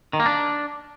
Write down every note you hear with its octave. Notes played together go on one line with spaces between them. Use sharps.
D#3
A#3
D4